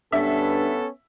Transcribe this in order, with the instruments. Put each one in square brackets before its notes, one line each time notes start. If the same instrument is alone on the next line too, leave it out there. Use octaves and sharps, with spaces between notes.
[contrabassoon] G2 [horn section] B3 C#4 A4 [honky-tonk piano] E5